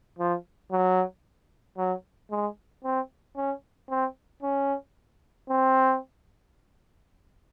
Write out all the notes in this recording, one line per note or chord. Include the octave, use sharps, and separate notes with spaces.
F3
F#3
F#3
G#3
C4
C#4
C4
C#4
C4